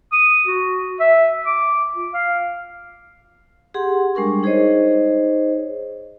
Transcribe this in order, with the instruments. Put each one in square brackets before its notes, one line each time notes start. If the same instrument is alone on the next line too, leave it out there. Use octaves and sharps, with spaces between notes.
[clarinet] D#6
F#4
E5
D6
F4
F5
[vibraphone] G4 G#4 F#5 C6
G3 G#3 D4 A#4 C#6
D#4 G#4 C5 C#5 D#5